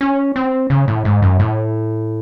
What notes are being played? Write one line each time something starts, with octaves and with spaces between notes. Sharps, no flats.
C#4
C4
C#3
A2
G#2
F#2
A2